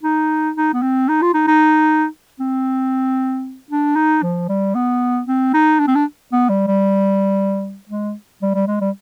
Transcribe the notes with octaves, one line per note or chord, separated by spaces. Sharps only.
D#4
D#4
B3
C4
D#4
F4
D#4
D#4
C4
D4
D#4
F3
G3
B3
C4
D#4
D4
C4
D4
B3
G3
G3
G#3
G3
G3
G#3
G3